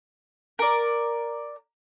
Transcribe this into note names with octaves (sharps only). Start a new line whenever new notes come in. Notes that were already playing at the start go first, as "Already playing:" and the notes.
A#4 D5